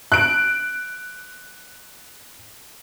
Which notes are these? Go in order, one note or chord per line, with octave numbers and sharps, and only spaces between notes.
F#6 D7